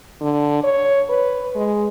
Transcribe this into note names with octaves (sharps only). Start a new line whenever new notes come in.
D3
C#5
B4
G#3